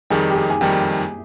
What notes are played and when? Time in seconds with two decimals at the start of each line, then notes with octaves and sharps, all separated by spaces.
0.10 F2 D#3 G3 G#4
0.30 G4
0.36 G#4
0.50 G#5
0.61 F2 D#3 G3 G5